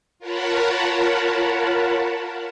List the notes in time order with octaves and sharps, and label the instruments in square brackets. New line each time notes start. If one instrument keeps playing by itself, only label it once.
[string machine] F4 A#4 C#5 F#5 A5 B5